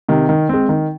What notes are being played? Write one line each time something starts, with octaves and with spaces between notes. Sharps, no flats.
C3 D#3
D#3
G#3 C4
D#3